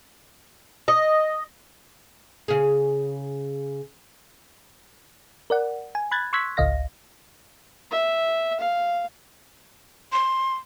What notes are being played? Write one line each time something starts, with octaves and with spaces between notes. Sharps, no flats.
D#5
C#3 G#4
A#4 D5 F#5
G#5
B5 F#6 G#6 A6
C6 C#6 E6 F#6 G#6 B6
G#1 C#2 D#5 F5 A#6
E5
F5
C6